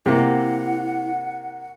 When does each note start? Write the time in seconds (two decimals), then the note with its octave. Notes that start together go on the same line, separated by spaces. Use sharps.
0.06 C3 A#3 E4 F#5